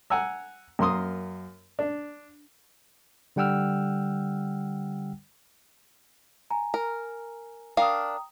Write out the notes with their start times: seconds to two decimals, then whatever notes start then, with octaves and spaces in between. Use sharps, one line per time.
0.10 F#5 G#5 A#5 E6
0.79 F#2 A#3 C6 D#6
1.79 D4
3.36 D3 G3 F#5 G5 E6 F6
6.51 G#5 A#5
6.74 A#4
7.77 D4 A#4 F5 G5 A#5 D#6